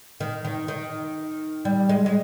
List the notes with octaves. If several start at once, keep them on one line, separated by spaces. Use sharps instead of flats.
D#3
D#3
D#3
G3
G#3
G#3